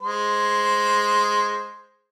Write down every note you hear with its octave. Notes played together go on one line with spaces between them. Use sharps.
G#3 C5